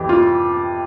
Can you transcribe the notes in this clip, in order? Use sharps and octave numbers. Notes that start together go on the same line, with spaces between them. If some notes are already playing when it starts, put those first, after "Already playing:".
Already playing: F2 E3 G4
F4